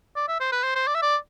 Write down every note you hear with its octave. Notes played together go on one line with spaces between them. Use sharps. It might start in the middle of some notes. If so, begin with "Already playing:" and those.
D5
E5
C5
B4
C5
C5
D5
E5
D5